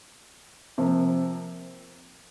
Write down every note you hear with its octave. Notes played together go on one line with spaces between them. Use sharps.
C3 F3 A#3